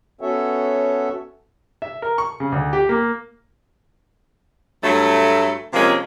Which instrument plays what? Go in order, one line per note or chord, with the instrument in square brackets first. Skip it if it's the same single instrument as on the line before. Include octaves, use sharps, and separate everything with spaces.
[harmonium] B3 C#4 F#4 A4 C#5 E5
[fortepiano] E5
A#4
C#6
C#3
D2
G4
A#3
[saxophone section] G2 F#3 A3
C3 F3 G#3 A#3 C#4